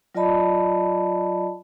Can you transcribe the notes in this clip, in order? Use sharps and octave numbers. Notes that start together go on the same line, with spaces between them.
F#3 F4 D5 D#5 A5 B5